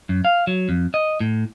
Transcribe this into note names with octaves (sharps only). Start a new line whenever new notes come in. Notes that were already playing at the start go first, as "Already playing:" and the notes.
F#2
F5
F#3
F2
D#5
A2